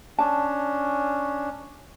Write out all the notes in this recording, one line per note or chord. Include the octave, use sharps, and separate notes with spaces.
C#4 D4 A5